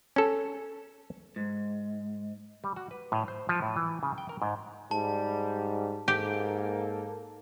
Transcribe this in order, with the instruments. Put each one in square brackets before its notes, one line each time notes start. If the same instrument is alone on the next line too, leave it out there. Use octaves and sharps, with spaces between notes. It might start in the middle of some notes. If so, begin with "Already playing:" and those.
[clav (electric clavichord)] C#4 A4
[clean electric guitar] G#2
[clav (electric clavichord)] G3
F#4
B4
A2
C5
F3
A2
E3
C#3
G5
A#4
G#2
[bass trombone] G#2 [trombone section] G3 [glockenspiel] A5
[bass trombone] G#2 [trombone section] A#3 A4 [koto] G4